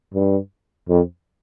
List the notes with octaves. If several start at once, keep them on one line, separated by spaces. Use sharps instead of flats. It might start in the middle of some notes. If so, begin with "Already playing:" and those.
G2
F2